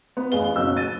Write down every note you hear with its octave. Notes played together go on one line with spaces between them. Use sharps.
B3
A1 G#4 F5 G7
F#1 B1 C#4 D#4 E6 F#6
A6 D#7